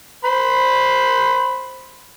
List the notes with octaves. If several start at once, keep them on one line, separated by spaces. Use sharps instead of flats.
C5 B5 C6